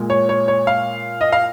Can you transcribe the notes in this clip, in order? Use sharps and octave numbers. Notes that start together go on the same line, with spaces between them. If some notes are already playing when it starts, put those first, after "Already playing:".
Already playing: A#2 G#3
C#5
C#5
C#5
F5
D#5
F5